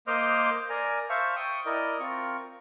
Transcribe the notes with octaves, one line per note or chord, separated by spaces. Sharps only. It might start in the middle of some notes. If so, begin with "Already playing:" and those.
A#3 C5 D#5 C6 D6 F6
A#4 D5 G#5 A#5
C5 E5 F5 A5 C#6
G5 C#6 D#6
E4 A#4 D5 D#5
C4 F4 A#4 C#6